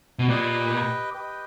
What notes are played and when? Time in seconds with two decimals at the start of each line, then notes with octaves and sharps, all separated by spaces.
0.19 B2
0.29 A#2 G4 B4 D#5 G5
1.14 G4 B4 D#5 G5